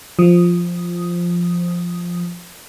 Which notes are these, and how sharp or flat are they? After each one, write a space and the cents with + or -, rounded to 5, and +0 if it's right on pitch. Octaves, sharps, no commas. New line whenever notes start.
F3 +0 D#6 +0